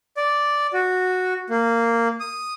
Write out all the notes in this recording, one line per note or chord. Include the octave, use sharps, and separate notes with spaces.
D5
F#4
A#3
D#6